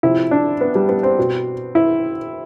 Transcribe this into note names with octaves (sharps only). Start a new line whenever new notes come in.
C3 F3 E4
D4
B3
G3
B3
C4
B2
E4